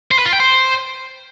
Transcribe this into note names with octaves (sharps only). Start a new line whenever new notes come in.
C5
B4
F4
G5
C5